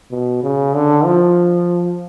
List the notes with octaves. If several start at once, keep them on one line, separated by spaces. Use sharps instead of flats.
B2
C#3
D3
F3